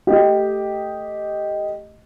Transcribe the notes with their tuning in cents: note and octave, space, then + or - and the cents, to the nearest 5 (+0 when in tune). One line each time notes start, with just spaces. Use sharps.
A3 +0 G4 +0 D#5 +0